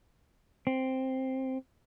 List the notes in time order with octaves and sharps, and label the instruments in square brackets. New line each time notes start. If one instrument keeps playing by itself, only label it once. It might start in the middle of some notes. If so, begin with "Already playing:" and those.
[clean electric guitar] C4